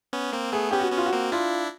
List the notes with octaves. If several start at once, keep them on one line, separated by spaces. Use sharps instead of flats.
B3 C#4
A#3 C4
A3 B3 G#4
B3 C#4 G4
F#4
B3 C#4
F4
F#4
A#3 C4
D4 E4 F4